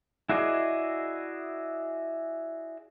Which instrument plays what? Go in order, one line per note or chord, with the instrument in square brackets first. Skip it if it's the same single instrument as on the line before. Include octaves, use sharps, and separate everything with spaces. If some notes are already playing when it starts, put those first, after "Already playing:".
[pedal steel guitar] E4 F#4 G#4 D5 D#5